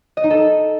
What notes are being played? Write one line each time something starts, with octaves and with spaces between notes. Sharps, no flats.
D#5
D#4
A4